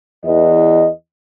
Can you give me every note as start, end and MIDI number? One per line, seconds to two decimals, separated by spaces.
0.24 0.86 40
0.24 0.86 52
0.24 0.86 75